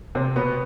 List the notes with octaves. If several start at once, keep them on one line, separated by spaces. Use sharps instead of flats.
C3 C4
B2 B3